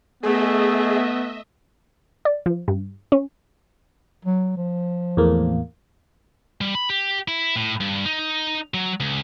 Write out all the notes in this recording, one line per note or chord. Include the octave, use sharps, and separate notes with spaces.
A3 B3 G#4 D#5 E5
D5
F3
G2
C#4
F#3
F3
E2 A2 A#3
G3
B5
G4
E4
A2
G2
D#4
F#3
C#2